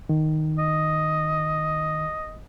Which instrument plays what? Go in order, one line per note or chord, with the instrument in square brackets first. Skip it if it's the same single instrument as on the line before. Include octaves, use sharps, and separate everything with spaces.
[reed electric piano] D#3
[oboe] D#5